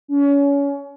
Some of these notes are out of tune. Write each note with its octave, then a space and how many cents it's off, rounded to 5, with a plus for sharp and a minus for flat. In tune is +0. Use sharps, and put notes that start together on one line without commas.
C#4 +30